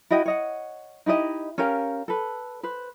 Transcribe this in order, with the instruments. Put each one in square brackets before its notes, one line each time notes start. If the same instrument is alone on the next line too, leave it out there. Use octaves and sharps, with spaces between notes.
[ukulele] E4 F#4 D#5 G5
C#5 D#5 F#5
D#4 E4 G4 D#5
C#4 G4 A#4 F5
A4 B4
B4 C5